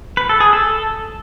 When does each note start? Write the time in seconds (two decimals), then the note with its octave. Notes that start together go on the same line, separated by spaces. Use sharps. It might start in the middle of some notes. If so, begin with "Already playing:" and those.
0.17 B4
0.29 A4
0.40 G#4
0.53 A4